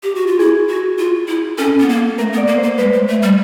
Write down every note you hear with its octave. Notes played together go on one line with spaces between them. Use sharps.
G4
F#4
F4
E4 G#4
F#4
F4
E4
C#4 A4
B3
A#3
A3 A#4
B3
D5
A#3
C5
A#3
G#3 B4
G#3
A3
G3